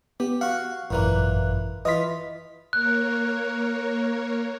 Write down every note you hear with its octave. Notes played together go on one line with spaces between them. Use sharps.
B3 G4
F#4 F5 F#5
G#1 F#2 A#2 E3 A#3 F#6
E3 F4 D#5 B6
A#3 A#4 C#5 F#6